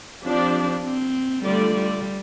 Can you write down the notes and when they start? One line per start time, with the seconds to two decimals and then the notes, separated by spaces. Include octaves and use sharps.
0.24 F3 C4 D4 G4 D5
0.85 C4
1.44 D3 G3 A3 F4 D5
1.75 G3